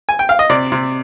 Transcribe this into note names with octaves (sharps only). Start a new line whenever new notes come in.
G#5
G5
F5
D#5
C3 D5
C3